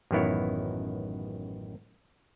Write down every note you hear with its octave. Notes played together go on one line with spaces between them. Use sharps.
A1 F#2 D#3 B3 E4 C#5